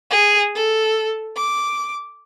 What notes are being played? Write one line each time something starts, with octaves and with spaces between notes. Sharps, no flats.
G#4
A4
D6